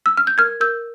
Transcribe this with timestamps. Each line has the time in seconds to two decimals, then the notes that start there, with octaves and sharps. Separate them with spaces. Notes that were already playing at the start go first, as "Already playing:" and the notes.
0.06 E6
0.17 F6
0.27 G6
0.38 A#4 F6 G#6
0.60 A#4 E6 G6